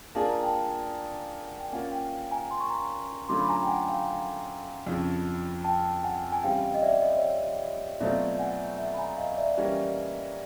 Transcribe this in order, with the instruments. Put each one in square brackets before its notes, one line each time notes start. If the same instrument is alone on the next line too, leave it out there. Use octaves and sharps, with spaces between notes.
[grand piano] A#3 D4 F4 G#4 [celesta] A5
[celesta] A#5
G5 A5
F#5
G5
[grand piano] A#3 C#4 F4 [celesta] F#5 G#5
[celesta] F5 G5
G#5 A#5
C6
C#6
A#5 C6
[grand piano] D3 F#3 A3 C#4 F4 [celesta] C6 D6
[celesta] B5
G#5 A#5
G5
F#5 G#5
F5 G5
[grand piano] F2 C#3 F3
[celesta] G5 A5
F#5 G#5
G#5
[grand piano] C#3 E3 G3 C4 E4 [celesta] F5 G5
[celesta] D#5
D5 E5
D#5
E5
C#5 D#5
[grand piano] B2 F#3 A3 C4 F4 [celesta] D5 E5
[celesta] F#5 G#5
E5 F#5
B5
G#5 A#5
D#5 F5
D5 E5
[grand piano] E3 G3 A#3 C#4 F#4